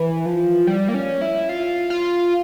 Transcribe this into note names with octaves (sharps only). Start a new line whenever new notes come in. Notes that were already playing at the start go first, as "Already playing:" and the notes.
Already playing: E3
F3
G3
A#3
C#4
E4
F4
F4